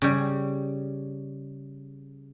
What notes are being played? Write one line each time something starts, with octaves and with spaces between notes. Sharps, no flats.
C#3 G3